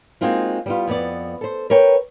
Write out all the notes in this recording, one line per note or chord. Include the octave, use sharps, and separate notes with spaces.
G#3 A#3 C4 D#4 F4 F#4
G3 B3 F4
F2 B3 D5
A4 C5
A#4 B4 C#5 G5